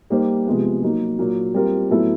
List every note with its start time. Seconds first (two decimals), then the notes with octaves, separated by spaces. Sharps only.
0.10 G3 A#3 D#4 G4 C5
0.47 C3 F3 G#3 B3
0.83 F#3 A#3 D#4
1.19 A#2 F#3 A#3
1.54 G3 C4 F4 A#4
1.91 A2 F#3 B3 E4 A4